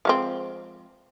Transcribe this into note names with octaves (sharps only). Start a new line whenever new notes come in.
F3 G#3 C4